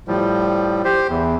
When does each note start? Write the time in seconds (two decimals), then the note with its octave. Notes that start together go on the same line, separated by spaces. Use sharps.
0.08 A2 F3 G3
0.85 G4 C5
1.09 E2